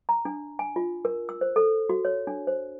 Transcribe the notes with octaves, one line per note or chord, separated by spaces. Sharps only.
A#5
D4
G#5
F4
A#4
E6
C5
A4
F#4
C#5
D4
C5